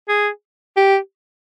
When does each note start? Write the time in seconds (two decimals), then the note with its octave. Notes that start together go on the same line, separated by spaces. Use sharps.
0.09 G#4
0.77 G4